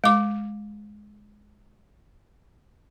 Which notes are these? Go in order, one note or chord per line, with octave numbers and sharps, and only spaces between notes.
G#3 D6